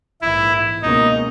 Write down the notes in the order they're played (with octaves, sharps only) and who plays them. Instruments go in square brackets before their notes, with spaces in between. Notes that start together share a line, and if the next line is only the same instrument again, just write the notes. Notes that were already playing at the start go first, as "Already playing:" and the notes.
[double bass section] A#1 G#2 E3 [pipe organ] E4
[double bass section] C#2 B2 A#3 C#4 [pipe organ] D#4